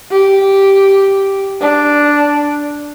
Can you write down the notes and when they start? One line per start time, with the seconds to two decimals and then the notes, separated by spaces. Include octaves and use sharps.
0.11 G4
1.61 D4